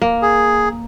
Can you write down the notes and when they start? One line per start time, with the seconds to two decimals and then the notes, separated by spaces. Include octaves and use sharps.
0.02 A#3
0.22 G#4